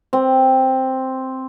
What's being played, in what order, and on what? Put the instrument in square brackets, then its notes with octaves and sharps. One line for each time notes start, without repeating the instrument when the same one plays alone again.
[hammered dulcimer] C4